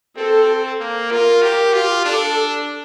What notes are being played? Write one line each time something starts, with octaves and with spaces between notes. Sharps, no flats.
C4 A4
A#3
F4 A#4
G4 A#4
F4 G4
D4 A4